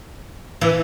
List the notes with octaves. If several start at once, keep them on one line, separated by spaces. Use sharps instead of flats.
E3